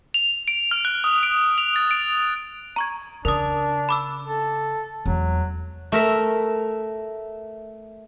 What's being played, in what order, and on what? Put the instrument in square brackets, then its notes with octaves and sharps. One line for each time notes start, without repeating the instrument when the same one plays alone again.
[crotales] F7
D7
F6
F#6
D#6
D7
F7
A6
D7
[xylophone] A#5 C#6 G#6
[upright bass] C#3 [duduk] D4 [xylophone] A#4 D#6
[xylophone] B5 D6 E6
[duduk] A4
[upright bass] E2 G#3 [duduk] F#3
[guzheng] A3 A#4 E5